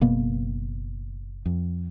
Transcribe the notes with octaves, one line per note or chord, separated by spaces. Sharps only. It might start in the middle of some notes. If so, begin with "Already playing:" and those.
F#1 B2 A#3 B3
F2